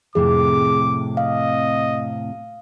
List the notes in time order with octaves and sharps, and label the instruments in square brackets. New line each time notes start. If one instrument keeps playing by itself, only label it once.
[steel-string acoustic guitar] F2 A2 C3 [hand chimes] G#4 [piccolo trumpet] D6
[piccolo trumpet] D#5 [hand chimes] F5